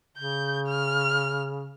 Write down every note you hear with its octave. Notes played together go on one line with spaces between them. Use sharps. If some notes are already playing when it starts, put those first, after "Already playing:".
C#3 G6
F6